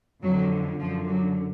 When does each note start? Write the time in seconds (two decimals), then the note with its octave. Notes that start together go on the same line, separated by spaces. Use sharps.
0.23 F2 D3 F#3
0.80 F#2 D3 F3
1.10 F#3